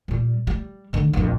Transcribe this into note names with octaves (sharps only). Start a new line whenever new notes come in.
A#2 G3
G3
D3 D#3
A#1 F2